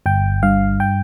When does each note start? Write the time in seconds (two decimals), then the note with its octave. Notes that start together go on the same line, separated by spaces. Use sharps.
0.06 G1 G5
0.43 G2 F5
0.80 G5